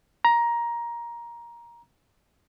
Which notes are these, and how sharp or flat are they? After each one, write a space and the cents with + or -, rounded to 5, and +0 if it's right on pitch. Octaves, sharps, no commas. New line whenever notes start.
A#5 +15